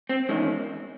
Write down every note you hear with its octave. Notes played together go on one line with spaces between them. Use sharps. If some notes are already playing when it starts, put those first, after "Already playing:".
C4
E2 D#3 G#3 C#4